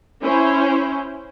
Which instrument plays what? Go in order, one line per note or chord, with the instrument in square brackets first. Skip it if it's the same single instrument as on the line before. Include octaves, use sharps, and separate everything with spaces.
[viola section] C#4 E4 C5